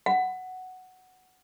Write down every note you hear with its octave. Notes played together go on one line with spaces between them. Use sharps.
F#5